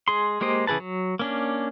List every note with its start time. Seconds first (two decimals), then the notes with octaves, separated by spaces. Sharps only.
0.08 G#3 G#4 C6
0.41 G#3 A#3 G4 C5 D#5
0.67 C#3 E3 G#4 B4 A5
0.80 F#3
1.19 A#3 C#4 D4